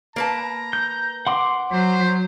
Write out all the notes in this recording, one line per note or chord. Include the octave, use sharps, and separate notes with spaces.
A#3 B4 A5 A#5
G6
F#5 C6 D6
F#3 C5